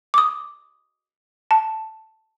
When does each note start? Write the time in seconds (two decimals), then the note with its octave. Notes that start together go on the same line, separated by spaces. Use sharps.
0.14 D6 D#6
1.51 A5